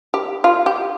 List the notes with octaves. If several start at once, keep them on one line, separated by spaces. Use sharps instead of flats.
G4
F4
G4